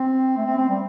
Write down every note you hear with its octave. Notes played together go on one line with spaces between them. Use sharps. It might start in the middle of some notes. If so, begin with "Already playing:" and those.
Already playing: C4
A3
C4
C4
G3